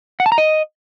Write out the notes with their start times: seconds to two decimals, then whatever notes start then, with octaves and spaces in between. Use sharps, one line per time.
0.20 F#5
0.26 A5
0.32 A#5
0.38 D#5